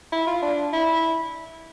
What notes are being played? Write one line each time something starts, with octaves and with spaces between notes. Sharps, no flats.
E4
F4
D4
E4